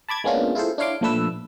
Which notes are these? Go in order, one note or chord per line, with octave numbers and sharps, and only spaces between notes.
A5 B5 D6 G#6 A6
G#3 A#3 B3 C#4 D4 F4
E4 F4 G#4 A4 C5
D4 E4 C#5 F5 C6 D6
A#2 F3 A3 D4 B4 E6